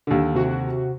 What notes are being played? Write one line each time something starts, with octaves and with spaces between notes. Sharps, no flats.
D#2 D3
C3 F#4